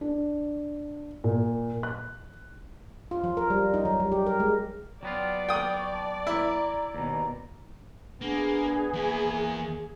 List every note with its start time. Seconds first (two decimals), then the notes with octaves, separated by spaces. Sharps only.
0.01 D4
1.24 A#2
1.83 F#6
3.11 F4
3.24 F3
3.37 A#4
3.50 G3
3.74 D#4
3.85 F#3
4.00 G3
4.12 G4
4.26 A#4
4.40 G#3
5.03 F#3 B3 F4 D5 G5
5.49 G5 C#6 D#6
5.93 A5
6.27 E4 A#5
6.95 D#2 B2 A#5
8.21 A#3 B3 D4 G#4
8.93 E2 A#3 E4